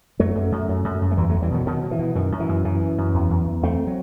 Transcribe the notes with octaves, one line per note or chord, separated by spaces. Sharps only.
F#2 F#3 A3
F#2
F#2
F#2
F#2
F#2
A3
E2 E3 G3
E2 F#3 A3
E3 G3
B2 D#3 F#3
B2 D#3 F#3
B2
E3
B2
F#2 D#3
F#2
E3
F#2
F#2 E3
F#2
F#2
E2
E2
E2
E2 A3 C4
F#3